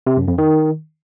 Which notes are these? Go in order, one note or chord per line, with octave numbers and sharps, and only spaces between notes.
C3
F#2
F2
D#3